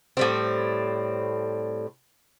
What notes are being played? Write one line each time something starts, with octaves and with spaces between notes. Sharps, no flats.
A2 G3 C4